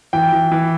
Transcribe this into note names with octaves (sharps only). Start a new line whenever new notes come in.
E3 G5
E3
E3